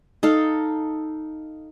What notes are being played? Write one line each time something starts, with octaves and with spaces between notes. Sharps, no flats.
D#4 A4 F5